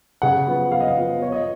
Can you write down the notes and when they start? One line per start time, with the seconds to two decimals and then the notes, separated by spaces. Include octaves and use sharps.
0.22 C#3 F#5
0.47 F3 B3
0.72 C#3 F5
0.80 D#5
0.88 F5
0.97 F3 B3
1.22 F3 C#5
1.32 D#5